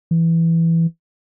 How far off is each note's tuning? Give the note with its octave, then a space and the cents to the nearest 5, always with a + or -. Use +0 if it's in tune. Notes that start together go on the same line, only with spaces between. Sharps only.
E3 +5